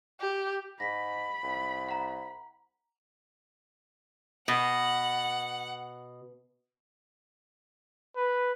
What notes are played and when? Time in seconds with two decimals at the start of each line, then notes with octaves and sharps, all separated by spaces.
0.20 G4
0.80 G#2 B5 A#6 B6
1.43 C2
1.89 F#5 A#5
4.48 B2 F#5
8.16 B4